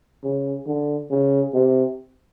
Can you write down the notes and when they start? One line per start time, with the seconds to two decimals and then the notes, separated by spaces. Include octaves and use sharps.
0.23 C#3
0.66 D3
1.10 C#3
1.53 C3